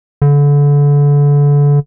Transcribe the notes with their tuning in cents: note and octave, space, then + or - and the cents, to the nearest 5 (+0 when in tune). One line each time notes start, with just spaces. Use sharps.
D3 -30